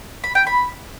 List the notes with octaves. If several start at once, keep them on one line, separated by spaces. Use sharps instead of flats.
B5
G5
B5